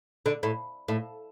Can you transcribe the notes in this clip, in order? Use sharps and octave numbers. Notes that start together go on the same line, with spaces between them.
D3
A2
A2